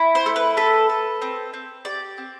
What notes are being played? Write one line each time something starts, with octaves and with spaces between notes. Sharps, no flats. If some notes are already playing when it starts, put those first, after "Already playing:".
Already playing: E4
C5
A3
B4
A4 B4
A4
C4
C4
G4 D5
C4